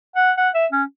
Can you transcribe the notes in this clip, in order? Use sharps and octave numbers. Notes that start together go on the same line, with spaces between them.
F#5
F#5
E5
C#4